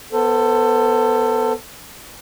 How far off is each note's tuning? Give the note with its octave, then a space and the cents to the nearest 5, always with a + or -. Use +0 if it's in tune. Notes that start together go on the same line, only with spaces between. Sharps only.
B3 +0 A4 +25 C5 +0